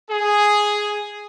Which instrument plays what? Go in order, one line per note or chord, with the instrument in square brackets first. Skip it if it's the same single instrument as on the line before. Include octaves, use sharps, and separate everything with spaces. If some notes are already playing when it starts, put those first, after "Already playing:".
[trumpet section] G#4